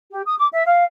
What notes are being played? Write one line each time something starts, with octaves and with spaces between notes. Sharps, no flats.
G4
D#6
D6
E5
F5